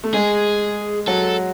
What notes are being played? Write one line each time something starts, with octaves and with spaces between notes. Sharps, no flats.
A3
G#3 G#4
F#3 A4